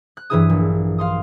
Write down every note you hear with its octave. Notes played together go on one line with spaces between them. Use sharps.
F#6
G2 E3 F#3 E4 G#4 D#6
A#1
F5 C6 D#6